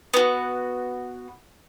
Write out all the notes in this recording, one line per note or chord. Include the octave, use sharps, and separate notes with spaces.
B3 F#4